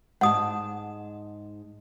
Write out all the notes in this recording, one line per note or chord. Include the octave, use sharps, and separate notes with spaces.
G#2 F#5 A5 D#6